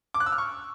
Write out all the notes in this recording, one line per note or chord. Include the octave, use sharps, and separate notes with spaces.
D6
F#6
E6
F6
C#6